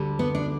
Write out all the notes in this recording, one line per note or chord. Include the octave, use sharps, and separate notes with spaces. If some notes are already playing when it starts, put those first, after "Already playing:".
Already playing: D2 D3 G3
B3
D4